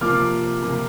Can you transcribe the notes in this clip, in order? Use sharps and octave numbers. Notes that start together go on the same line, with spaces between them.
C3 F3 A#3 F4 D6 F6
C3 F3 A#3 F4